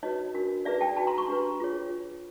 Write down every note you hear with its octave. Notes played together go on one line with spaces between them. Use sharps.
D#4 F#4 B4 C#5 D#5
D4 F#4 A#4
D#4 G#4 B4 D5 E5
G5 A5
D#4 F#4 B4 A5 B5
A#5 C6
B5 C#6
D4 G4 B4
F4 G#4 C#5